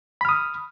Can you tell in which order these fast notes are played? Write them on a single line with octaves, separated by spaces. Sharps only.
B5 F6 D#6